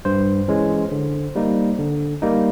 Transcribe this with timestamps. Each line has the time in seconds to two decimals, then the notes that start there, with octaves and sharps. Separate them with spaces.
0.05 G2 C5
0.48 E3 G#3 C#4
0.92 D3
1.35 G3 A#3 D#4
1.79 D3
2.22 G3 A#3 D#4